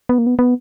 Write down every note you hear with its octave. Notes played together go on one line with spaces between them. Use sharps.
B3
A#3
B3
B3